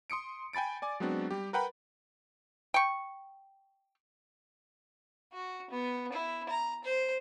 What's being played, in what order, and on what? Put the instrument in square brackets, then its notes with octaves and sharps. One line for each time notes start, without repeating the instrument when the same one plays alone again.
[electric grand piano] C6 D#6 C#7 D7
G5 G#5 B5 A6 D7
D5 G#5 D6
F#3 G#3 B3 C4 D4 F#4
G3 G4
A#4 B4 F#5 G5 A#5 B5
[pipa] G5 C#6
[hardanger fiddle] F#4
B3
E4
A#5
C5